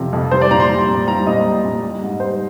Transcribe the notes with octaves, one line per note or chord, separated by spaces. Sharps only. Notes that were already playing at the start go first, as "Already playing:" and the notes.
Already playing: F2 C3 F3
F2
G3 C5
D5
A#2 A#5
C6
G3
A#2
G3 A#5
A#2 D#5
G3
A#2
G3
G#2
G3 C5